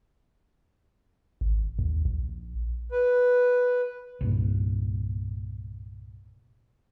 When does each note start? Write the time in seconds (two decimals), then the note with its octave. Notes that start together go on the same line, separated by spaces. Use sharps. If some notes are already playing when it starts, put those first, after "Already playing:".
1.41 G#1
1.79 D#2
2.05 A#1
2.92 B4
4.21 C2 G2 A#2